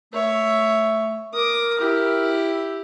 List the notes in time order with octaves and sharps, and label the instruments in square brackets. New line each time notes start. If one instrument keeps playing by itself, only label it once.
[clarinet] A3 [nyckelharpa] C#5 E5
[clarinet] A#4 [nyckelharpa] D6 D#6
[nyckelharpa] E4 G4